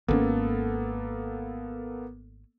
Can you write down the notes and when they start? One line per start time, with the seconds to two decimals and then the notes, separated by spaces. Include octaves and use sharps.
0.08 G#1 C#3 A#3 B3 C#4 A4